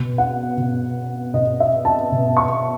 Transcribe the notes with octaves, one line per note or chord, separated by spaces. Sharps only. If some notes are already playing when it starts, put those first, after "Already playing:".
Already playing: B2
F#5
B2
B2 D#5
E5
A5
B2
C#6